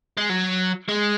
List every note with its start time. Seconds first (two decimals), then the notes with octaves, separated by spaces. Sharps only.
0.17 G#3
0.29 F#3
0.89 G#3